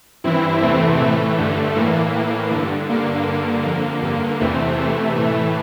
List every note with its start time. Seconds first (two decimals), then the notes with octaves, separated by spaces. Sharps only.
0.24 G2 E3 C4 E4
0.62 E2 C3 E3 A3 C4
1.00 A2 E3 A3
1.38 G2 D3
1.76 A2 E3 A#3
2.14 A2 E3
2.51 G2 D3
2.89 G2 D3 A#3
3.28 G2 D3
3.65 F2 D3
4.03 G2 D3
4.40 E2 C3 E3 A3 C4
4.78 E2 C3 E3 A3
5.16 A2 E3 A3